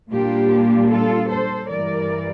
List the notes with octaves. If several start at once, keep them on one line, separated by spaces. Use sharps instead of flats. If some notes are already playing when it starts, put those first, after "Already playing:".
A#2 G3 A#3 D4 F4 G4
F4 A4
A4 C5
G2 E3 G3 A#4 D5